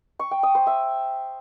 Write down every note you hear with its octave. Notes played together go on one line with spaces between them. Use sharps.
C#6
G5
D#6
C5
E5